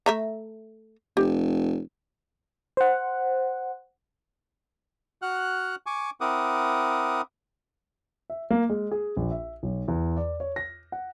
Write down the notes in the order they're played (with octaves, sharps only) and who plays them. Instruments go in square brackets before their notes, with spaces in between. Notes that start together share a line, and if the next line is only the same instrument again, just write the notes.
[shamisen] A3 E5 A#5
[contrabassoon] F1 [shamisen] G4
[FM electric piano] C5 F#5
[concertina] F#4 F#5 F6 F#6
G#5 C#6 D6
C4 E4 A#4 F#5 D6 D#6
[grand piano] E5
A#3
G#3
G#4
A#1
E5
B1
E2
D5
C#5
A#6
F#5